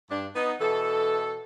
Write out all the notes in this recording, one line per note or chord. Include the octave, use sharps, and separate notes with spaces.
G2 D4
B3 D#4
B2 E3 A4